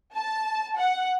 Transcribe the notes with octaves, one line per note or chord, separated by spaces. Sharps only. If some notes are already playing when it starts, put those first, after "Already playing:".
A5
F#5